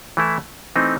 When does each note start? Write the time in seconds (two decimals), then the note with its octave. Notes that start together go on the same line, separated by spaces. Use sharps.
0.17 E3 A3 E4
0.76 E3 A3 C4 D#4